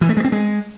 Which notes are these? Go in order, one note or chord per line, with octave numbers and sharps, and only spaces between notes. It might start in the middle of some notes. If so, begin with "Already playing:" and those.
E3
A3
G#3
C4
G#3